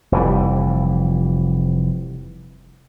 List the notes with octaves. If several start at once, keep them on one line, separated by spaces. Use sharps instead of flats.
F1 F2 E3 G3